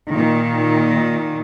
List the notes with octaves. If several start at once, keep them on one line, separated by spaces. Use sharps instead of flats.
A#2 D#3